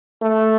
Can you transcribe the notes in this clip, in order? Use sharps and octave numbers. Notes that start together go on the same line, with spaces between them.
A3